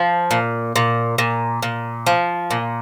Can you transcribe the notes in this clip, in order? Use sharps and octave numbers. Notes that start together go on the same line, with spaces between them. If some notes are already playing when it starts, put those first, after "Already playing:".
Already playing: F3
A#2
A#2
A#2
A#2
F3
A#2